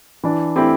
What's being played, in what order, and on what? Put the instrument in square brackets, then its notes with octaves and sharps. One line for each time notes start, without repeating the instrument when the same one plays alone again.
[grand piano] E3 [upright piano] D4
[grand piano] A3 E4 G4 [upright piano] C4